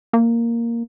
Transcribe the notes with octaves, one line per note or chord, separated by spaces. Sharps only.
A#3